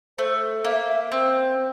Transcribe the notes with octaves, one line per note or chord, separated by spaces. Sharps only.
A3 C5
A#3 E5
E5
C4 C5